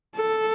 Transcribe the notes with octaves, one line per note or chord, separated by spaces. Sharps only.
A4